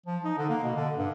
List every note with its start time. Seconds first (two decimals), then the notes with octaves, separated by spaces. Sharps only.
0.06 F3
0.24 D#4
0.38 D3
0.49 A#3
0.63 B2
0.76 D3
0.97 G2